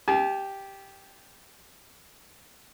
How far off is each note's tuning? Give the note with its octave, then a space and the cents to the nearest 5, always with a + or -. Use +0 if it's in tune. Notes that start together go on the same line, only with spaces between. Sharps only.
G4 +0 A5 -45